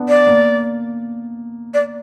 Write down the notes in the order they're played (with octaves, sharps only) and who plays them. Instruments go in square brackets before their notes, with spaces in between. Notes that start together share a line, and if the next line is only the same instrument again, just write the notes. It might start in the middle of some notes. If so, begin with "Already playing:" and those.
Already playing: [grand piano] B3 D4
[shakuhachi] D5
[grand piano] A#3
[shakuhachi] D5